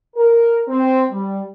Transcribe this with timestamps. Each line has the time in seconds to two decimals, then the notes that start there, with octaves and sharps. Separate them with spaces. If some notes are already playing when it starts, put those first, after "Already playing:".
0.16 A#4
0.67 C4
1.10 G3